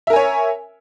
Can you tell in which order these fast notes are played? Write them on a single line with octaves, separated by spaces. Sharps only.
E5 A#4 G#5 C#5